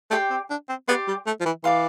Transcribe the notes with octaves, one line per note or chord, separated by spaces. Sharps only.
A3 G4 D5 G5 C6
C4
D4
C4
B3 G4 D5 G5 C6
G3
A3
F3
E3
E3 D5 F5 C6